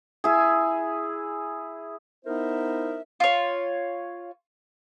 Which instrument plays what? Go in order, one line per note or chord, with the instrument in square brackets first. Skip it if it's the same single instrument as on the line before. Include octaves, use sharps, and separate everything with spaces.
[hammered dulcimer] E4 G#4
[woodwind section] B3 D#4 E4 A#4 C5 E5
[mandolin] F4 C#5